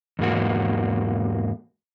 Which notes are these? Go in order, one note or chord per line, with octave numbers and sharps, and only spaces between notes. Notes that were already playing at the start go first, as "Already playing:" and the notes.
E2 G#2 A#3 F#4